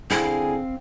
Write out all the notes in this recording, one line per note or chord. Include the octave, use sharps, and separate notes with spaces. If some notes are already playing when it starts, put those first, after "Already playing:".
D3 C4 E4 G#4 F5